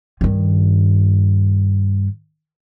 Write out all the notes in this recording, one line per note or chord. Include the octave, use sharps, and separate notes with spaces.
G2 D#3